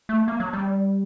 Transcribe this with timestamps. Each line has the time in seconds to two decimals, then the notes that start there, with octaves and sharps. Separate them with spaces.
0.09 A3
0.28 A#3
0.40 F#3
0.53 G3